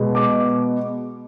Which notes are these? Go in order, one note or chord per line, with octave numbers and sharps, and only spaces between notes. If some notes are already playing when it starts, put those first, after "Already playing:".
Already playing: B2 G#3 B3
D6